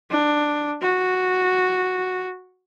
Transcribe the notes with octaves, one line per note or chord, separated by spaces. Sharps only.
D4
F#4